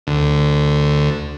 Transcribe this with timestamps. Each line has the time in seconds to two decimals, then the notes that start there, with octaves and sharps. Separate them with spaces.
0.07 D2